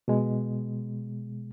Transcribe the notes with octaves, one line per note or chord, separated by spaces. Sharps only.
B2 G#3